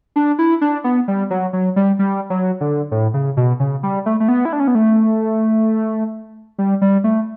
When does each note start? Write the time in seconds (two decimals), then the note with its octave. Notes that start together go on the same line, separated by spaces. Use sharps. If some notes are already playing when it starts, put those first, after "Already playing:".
0.16 D4
0.39 E4
0.61 D4
0.84 B3
1.08 G3
1.30 F#3
1.53 F#3
1.76 G3
1.99 G3
2.30 F#3
2.61 D3
2.91 A2
3.14 C#3
3.37 B2
3.60 C#3
3.83 G3
4.06 A3
4.20 A3
4.28 B3
4.45 E4
4.53 D4
4.60 C#4
4.68 B3
4.75 A3
6.58 G3
6.82 G3
7.04 A3